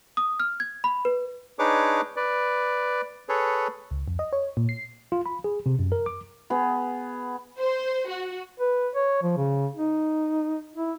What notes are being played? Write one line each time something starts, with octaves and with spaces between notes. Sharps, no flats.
D#6
F6
G#6
B5
B4
D4 D#4 G#4 B4 C#5 D6
B4 D5
G#4 A4 B4 C#5
C#2
F2
D#5
C#5
A#2
C7
F4
B5
G#4
C3
F#2
A#4
D6
B3 G#4
C5
F#4
B4
C#5
F3
C#3
D#4
E4